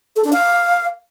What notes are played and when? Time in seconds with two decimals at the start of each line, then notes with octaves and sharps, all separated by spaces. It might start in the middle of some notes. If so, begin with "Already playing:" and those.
0.16 A4
0.24 D4
0.33 F5